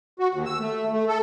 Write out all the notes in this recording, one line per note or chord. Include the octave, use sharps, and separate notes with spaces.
F#4
D#2
E6
A3
A3
A4